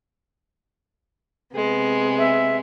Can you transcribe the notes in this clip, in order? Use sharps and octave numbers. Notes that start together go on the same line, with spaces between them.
C3 G#3 B3
E5